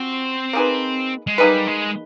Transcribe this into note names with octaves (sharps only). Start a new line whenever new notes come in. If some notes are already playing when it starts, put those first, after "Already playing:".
Already playing: F3 C4 F#4
A#3 D#4 G#4 B4
G#3
G3 A#3 D#4 G#4 B4
G#3